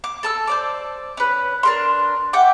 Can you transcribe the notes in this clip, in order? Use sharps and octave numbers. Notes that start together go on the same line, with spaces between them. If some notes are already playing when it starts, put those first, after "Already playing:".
D6
A4 A5 E6
C5 D5 D6
C#4 B4
D4 A#4 C6
E5 F#5 G5 D6